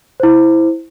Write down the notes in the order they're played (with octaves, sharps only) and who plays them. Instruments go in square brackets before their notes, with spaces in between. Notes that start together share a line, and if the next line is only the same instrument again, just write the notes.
[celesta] E4 C5